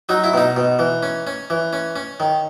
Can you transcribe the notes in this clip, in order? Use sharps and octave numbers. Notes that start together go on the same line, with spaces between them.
F#3 D#4
E4
B2 D#4
B2
E3
C#4
C#4
E3
C#4
C#4
D#3